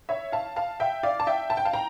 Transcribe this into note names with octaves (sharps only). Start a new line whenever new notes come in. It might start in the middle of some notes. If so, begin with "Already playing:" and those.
C#5 E5
F5 A5
F5 A5
E5 G5
D5 F5
A5
E5 G5
A5
G5
F5 A5
G5 A#5